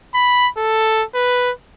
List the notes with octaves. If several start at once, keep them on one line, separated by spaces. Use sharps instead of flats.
B5
A4
B4